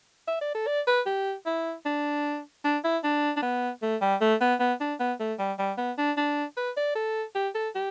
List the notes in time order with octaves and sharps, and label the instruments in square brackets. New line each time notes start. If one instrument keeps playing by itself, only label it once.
[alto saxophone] E5
D5
A4
D5
B4
G4
E4
D4
D4
E4
D4
D4
B3
A3
G3
A3
B3
B3
D4
B3
A3
G3
G3
B3
D4
D4
B4
D5
A4
G4
A4
G4